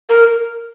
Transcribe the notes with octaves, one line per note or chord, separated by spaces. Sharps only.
A#4